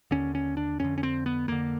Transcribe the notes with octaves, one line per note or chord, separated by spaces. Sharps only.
D#2 D3 C#4
C#4
D4
F2 D3 C#4
C#4
C4
B3
F2 D3 A#3